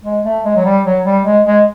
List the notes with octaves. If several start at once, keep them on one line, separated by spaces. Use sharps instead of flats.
G#3
A3
G#3
F#3
G3
F#3
G3
G#3
G#3